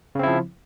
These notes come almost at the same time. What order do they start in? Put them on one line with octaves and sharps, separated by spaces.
C#3 C4 E4 F3